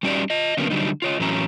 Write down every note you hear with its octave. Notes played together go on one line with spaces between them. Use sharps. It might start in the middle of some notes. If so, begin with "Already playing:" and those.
G3 C#4 D#4 F#4 G4 D5
F4 D#5
D3 F#3 A#3 B3 C#4
D3 F#3 G3 D4 D#4
F4 C#5 D#5
A2 E3 F#3 C#4 A#5